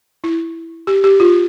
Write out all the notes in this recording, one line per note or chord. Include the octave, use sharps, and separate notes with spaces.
E4
G4
G4
F4